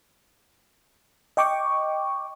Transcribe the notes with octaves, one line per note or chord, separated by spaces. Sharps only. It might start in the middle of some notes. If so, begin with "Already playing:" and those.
D#5 G5 C#6 D6